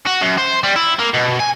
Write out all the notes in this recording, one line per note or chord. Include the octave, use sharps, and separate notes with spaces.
F#4
F#2
C5
G3
E4
A#3
B2
G#5